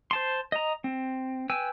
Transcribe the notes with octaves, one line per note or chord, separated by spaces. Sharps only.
C5 A5 C6
D#5 A#5
C4
B4 G5 G#5 E6